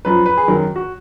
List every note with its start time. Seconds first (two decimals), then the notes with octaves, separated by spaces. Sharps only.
0.05 F#2 F3 B4
0.26 B4
0.37 G#4
0.48 F#2 D#3 F#3 A#4
0.76 F#4